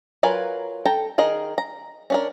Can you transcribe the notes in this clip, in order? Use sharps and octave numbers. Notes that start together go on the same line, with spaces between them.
F#3 F4 A#4 B4 G#5
A4 G5 A#5
D#3 G#4 A#4 D#5
A#5
C#4 D4 A#4